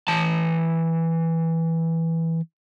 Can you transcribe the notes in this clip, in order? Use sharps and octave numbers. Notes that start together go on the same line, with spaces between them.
E3 A5